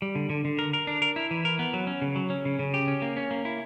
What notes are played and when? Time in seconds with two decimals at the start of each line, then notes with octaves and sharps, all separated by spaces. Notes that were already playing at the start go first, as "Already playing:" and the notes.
0.02 G3
0.15 D3
0.30 D3
0.45 D3
0.59 A#4
0.73 A#4
0.87 D4
1.02 A#4
1.16 E4
1.31 E3
1.45 A#4
1.59 B3
1.74 F#3
1.87 C#4
2.02 C#3
2.16 F#3
2.30 C#4
2.45 C#3
2.59 C#3
2.74 G4
2.88 C#4
3.02 A#3
3.17 C#4
3.31 A#3
3.45 E4